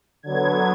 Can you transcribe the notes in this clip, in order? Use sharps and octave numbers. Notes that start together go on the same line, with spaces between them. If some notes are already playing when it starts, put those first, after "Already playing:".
D3 F#3 B3 G#6